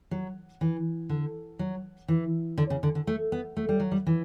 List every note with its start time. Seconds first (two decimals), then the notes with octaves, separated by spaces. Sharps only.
0.11 F#3
0.61 E3
1.09 D3
1.59 F#3
2.08 E3
2.58 D3
2.70 C#3
2.83 D3
2.95 D3
3.07 A3
3.32 B3
3.57 A3
3.69 G3
3.80 F#3
3.92 G3
4.07 E3